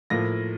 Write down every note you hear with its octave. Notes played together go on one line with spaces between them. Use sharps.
A2 F3 A#3 A#6